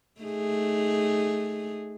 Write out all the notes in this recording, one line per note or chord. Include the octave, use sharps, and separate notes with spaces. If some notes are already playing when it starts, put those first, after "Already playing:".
A3 D#4 G#4